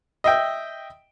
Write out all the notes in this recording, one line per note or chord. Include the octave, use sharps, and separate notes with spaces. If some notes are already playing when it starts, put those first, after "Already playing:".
D#5 E5 G5